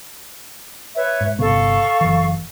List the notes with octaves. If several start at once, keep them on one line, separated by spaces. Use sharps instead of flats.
B4 C#5 E5
G#2
G1 C3 B3 A4 F5 C#6
F#1 E3